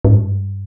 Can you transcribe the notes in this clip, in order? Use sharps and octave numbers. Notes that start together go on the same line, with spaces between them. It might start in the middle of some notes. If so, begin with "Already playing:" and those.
G#2
G2